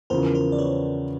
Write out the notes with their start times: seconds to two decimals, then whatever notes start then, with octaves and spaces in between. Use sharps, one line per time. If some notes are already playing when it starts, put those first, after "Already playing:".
0.10 E2 C#3 F3 A#4 C5
0.35 A#4 C5
0.52 D5
0.58 B4 C#5